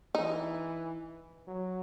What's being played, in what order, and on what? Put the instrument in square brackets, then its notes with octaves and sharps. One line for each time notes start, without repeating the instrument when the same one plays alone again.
[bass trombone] E3 [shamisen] D#4
[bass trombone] F#3